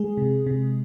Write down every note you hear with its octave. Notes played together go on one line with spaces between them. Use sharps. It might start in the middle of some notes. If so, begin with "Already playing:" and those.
Already playing: G#3 G#4
C3
C3